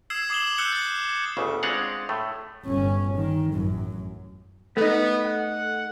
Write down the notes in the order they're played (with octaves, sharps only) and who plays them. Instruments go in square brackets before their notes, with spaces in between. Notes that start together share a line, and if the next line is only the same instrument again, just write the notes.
[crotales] D#6 E6 G#6 C7 E7
D6 D#6 C7 E7 F#7 G7
E6 F#6 G6 C#7 G7
A6
[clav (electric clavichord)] G1 D2 C#3
G#3 C4 D4 F5 F#5
A2 A3
[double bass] G1 C#4
D#3
A1 F#2
[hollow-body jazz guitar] A3 D#4 [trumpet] B3
[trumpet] F#5